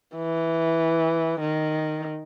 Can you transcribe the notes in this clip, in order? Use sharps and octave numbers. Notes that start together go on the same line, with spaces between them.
E3
D#3